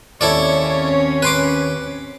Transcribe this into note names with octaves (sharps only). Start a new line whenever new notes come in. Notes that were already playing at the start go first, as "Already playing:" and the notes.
D#2 C4 C#4 E4 A4 C#5 D5
B4 C6 D6